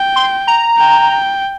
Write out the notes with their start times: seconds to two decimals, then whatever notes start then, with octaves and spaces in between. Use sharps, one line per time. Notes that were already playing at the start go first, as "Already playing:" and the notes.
Already playing: G5
0.16 C6
0.47 A#5
0.78 G5